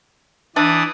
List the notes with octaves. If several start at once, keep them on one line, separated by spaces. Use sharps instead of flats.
E3 D4 D5 E5 D#6